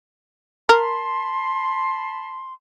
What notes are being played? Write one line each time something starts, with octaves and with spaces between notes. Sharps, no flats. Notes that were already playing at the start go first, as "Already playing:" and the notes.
A#4 A5 B5 C6